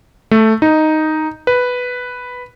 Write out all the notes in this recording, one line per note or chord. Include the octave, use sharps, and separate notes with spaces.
A3
D#4
B4